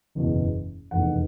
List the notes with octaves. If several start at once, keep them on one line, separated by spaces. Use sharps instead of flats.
F#1 E2 B2
F1 E2 B2 F#5